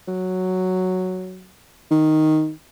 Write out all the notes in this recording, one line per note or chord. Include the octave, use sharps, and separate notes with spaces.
F#3
D#3